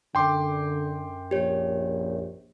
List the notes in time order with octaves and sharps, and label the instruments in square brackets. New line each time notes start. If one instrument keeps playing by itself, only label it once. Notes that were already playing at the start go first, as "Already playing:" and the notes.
[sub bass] F#2 [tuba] D3 [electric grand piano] G5 C6 D6
[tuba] A#1 [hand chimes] G4 C#5